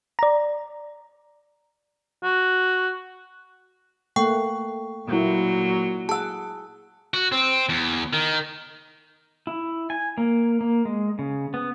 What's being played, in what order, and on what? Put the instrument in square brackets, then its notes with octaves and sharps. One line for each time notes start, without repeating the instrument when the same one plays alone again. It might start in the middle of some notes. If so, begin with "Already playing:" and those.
[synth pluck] D5 A#5
[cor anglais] F#4
[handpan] A3 A#3 F#5 [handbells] G5 C#6
[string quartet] A#2 F#3 [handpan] A#3 E4
[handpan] G#4 F#5 [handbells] A5 E6
[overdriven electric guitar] F#4
C4
E2
D#3
[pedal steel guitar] E4
G#5
A#3
A#3
G#3
C#3
B3